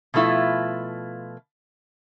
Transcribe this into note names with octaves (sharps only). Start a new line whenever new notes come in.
B2 F3 A3 E4 F4